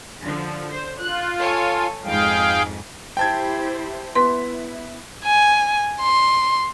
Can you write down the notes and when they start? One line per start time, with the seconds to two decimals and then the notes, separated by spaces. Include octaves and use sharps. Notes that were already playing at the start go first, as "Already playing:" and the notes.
0.22 D3 F3
0.70 C5
0.99 F4 F#6
1.37 A4 C#5 G#5
2.04 F2 G#2 G#4 F5 G5
3.17 E4 G4 C5 G5 A5 G#6
4.15 B3 E4 C6 B6
5.25 G#5
6.01 C6